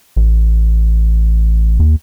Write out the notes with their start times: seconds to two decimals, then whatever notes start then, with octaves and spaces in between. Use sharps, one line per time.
0.16 A1
1.80 D#2